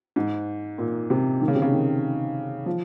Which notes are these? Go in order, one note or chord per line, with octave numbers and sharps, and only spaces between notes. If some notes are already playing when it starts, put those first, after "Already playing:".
G#2
A#2
C3
D#3
C#3
C3
C#3
D#3
F3